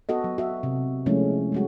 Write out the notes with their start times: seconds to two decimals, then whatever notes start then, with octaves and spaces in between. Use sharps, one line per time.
0.09 B3 F#4 A4 D#5
0.24 F#3
0.38 F#4 E5
0.63 C3
1.06 F3 G#3 A3 C#4 E4
1.52 G3 G#3 F#4